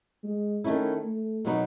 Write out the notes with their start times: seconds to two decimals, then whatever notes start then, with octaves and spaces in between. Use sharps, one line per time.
0.23 G#3
0.64 D#3 A3 C#4 E4
1.04 A3
1.45 B2 F#3 B3 D#4